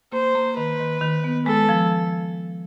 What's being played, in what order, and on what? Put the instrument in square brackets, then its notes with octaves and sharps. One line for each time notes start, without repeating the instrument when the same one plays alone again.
[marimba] A#3 [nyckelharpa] C5
[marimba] A#3
[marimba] D#3 [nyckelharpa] B4
[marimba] D#3
D#3
B3
[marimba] G#3 [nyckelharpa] A4
[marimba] F3